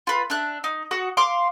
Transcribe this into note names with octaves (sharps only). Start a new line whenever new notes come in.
F4 B4
D4 E5 F#6
D#4
F#4 F#5 D#6
F5 C6 D6